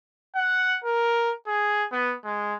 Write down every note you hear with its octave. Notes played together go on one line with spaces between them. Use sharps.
F#5
A#4
G#4
B3
G#3